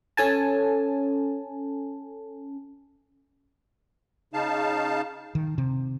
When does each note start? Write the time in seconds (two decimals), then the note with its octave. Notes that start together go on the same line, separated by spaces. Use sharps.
0.17 C#4 A4 G#5 A5
4.33 C#3 D#4 F5 A5
5.35 D#3
5.58 C3